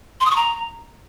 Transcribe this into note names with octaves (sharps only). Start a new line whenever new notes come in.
C6
D#6
C#6
A#5